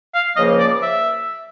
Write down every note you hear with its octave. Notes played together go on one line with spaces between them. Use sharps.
F5
C#2 C#3 F3 A#3 D#5
D5
E5